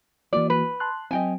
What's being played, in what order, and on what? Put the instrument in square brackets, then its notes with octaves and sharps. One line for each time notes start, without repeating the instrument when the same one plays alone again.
[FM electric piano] E3 A#3 F#4 [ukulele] D5
[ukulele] B4
[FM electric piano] A5 C6 F#6
[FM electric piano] F#3 C4 [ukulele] D#5 G5 G#5